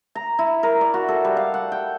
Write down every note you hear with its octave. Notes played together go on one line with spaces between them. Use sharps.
A#5
E4
A#4
D5
F#4
A4
G3
F5
F#5
G5